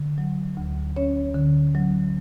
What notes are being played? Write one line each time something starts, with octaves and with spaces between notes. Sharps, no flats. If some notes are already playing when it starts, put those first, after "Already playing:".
Already playing: D3
F#3
D2
C#4 C#5
D3
F#3